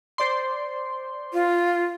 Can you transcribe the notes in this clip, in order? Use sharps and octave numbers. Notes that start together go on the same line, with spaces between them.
C5 D5 C6
F4